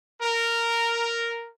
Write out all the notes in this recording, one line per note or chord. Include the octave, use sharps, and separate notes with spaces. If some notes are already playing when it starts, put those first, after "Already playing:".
A#4